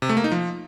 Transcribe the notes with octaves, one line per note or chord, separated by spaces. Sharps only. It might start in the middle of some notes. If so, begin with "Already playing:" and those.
C3
A3
A#3
D#4
F3